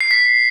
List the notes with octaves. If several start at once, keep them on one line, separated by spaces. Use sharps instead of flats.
C7
B6